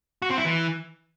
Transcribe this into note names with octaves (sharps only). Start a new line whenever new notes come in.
F#4
C4
E4
E3